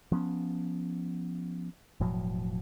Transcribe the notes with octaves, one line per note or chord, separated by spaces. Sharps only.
F3 B3 C#4
E1 A2 F3 F#3